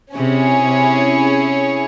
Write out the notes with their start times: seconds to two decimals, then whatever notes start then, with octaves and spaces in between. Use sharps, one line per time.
0.15 C3 C#4 E4 G#4 C#5
0.63 C3